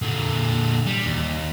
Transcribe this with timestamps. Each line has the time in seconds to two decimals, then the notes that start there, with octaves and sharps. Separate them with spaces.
0.02 A#2 D3
0.87 G3
1.06 D#2